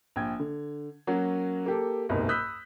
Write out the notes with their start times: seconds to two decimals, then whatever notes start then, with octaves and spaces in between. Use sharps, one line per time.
0.16 A#1 G5 G#6
0.40 D3
1.07 F#3 A#3 C#4 F#4
1.66 A#3 G4 A4
2.09 F#1 C2 G#2 B2
2.29 B5 D#6 E6 F#6 G6 B6